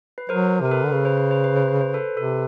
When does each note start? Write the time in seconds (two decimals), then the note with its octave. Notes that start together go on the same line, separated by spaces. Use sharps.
0.18 B4
0.29 F#3 A#4 C5
0.61 C3 A#4
0.71 A4 B4
0.84 D3
0.92 C#3 B4
1.05 C5
1.17 B4
1.31 C5
1.44 B4
1.56 C5
1.68 B4
1.81 C5
1.94 A4 B4
2.17 C3 A4 B4